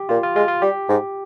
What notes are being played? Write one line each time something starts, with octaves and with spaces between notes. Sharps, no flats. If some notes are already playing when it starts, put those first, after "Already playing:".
Already playing: G4
A#2 F4
F4
G#3 F4
F4
G3 G4
G#2